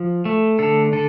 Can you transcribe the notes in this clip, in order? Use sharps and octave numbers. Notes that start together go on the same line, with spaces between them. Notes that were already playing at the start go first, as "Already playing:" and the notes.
Already playing: F3
A3
D3 A4
D3 A4